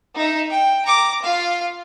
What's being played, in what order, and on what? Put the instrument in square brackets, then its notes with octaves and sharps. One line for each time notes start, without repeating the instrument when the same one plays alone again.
[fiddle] D#4 E5
G5
A#5 D6
F4 F5